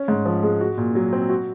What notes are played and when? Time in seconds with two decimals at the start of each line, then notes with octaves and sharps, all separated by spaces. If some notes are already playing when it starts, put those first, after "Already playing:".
Already playing: C#4
0.08 G#2
0.26 F3
0.43 G#3
0.61 F#4
0.78 A#2
0.95 F#3
1.13 C4
1.29 F#4